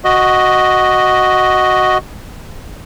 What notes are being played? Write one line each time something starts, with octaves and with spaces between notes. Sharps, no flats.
F#4 D#5